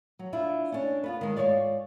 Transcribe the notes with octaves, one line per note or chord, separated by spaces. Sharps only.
F#3
D4 E4 F4 E5
C#4 D4
B3 F4 B4
D#3 G#3
G#2 D#3 F4 C#5 D5